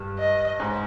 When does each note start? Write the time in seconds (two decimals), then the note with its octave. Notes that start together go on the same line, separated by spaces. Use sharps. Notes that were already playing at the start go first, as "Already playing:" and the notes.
Already playing: G2 G3
0.19 D#5
0.60 G#2 G#3